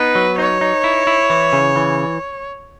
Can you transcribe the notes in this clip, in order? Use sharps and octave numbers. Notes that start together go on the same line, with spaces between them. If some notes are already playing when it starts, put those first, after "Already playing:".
Already playing: B3 D#4 B4
F#3
D#4 C#5
D#4
E4
E4
E3
C#3
E3